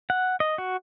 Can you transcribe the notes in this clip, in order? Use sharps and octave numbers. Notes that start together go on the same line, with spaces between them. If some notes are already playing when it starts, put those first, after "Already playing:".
F#5
D#5
F#4